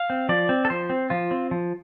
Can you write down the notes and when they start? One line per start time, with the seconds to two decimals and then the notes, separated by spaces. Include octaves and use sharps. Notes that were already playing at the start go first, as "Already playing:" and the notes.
Already playing: F5
0.10 C4
0.29 F3 D5
0.49 C4
0.65 A4
0.70 F3 C5
0.90 C4
1.10 F3 F4
1.31 C4
1.51 F3